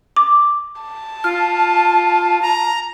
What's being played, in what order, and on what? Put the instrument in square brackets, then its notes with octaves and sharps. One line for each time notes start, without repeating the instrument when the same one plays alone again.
[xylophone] D6
[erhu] A5
[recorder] F4 [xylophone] F6
[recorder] A#5